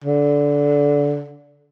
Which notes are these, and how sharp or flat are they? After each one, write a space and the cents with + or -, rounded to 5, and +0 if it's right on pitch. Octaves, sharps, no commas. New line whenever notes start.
D3 -20